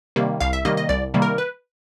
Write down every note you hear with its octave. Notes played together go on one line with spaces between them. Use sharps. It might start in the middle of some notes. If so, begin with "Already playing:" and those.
C3 D#3 G3 A#3
C2 F5
E5
C3 D#3 G3 A#3 D#5
D#5
C2 D5
C3 D#3 G3 A#3
A#4
B4